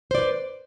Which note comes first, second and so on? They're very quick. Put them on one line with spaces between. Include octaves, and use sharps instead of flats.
C5 D5 B4